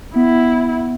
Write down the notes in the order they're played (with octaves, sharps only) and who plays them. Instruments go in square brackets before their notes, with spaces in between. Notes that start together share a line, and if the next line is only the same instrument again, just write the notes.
[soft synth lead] B3 [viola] E4